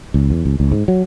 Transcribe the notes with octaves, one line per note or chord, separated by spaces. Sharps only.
C#2
E2
C#2
C#2
G#2
F#3